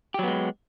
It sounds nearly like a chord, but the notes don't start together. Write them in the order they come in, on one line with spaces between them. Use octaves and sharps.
G4 F#3 B3 G#3